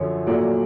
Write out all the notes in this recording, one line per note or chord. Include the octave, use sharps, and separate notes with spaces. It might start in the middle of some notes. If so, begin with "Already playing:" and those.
Already playing: F#2 D3 F3 C#5
A#2 F#3 A3 D5